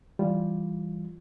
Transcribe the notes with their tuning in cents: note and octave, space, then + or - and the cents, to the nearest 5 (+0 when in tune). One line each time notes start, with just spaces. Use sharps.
E3 +0 G3 +0 F4 +0